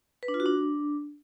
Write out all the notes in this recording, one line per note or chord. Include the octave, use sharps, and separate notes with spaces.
B4
D4
F4
F#4
D4